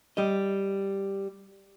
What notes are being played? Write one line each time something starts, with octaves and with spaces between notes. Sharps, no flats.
G3 D#5